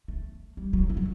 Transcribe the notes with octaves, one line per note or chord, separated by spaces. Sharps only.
A3
G3
F#3
E3
F#3